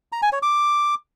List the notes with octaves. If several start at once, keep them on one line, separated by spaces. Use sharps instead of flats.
A#5
G#5
C#5
D6